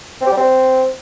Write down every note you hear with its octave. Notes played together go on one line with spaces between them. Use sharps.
C4
G4
G3
C4